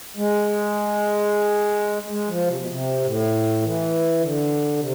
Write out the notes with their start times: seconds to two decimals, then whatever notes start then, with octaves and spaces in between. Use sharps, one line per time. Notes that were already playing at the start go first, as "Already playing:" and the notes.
0.17 G#3
2.09 G#3
2.28 F3
2.46 C3
2.57 B2
2.68 C3
3.04 A2
3.62 E3
4.20 D3
4.77 C3